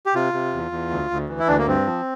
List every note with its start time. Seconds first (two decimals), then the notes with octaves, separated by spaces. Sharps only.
0.06 G4
0.14 C3 F4
0.33 C3
0.53 E2
0.72 E2
0.90 D2
1.11 D2
1.29 E3
1.39 E4
1.48 D2 D4
1.58 A#3
1.67 G2 C4
1.86 F3